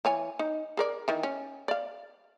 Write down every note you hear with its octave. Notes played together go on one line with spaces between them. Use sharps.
E3 C#5 G#5
D#4
G#4 A#4 D5
D#3 E3
C#4
D5 F5